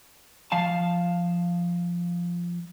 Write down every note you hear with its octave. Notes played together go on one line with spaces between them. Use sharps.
F3 F5 A5